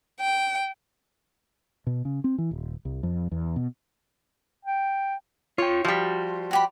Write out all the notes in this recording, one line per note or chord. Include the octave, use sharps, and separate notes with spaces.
G5
B2
C#3
C4
E3
D#1
C2
F2
E2
B2
G5
F4 C#5 G5
F3 G3 F#4
F#4 G4 B5